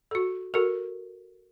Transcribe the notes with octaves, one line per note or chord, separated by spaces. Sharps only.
F#4 A4
F#4 A4 A#4